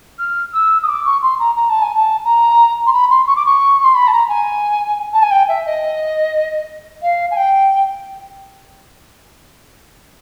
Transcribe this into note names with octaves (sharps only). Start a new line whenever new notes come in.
F6
E6
D#6
D6
C#6
C6
A#5
A#5
A5
G#5
A5
A#5
C6
B5
C6
C#6
D6
C#6
C6
B5
A5
A#5
G#5
A5
G#5
G5
E5
D#5
F5
G#5
G5